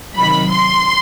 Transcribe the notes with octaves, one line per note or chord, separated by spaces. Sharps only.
C3 D#3 F#3 B5
C6